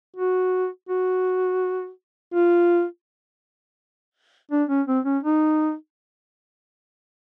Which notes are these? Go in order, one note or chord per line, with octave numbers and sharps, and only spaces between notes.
F#4
F#4
F4
D4
C#4
C4
C#4
D#4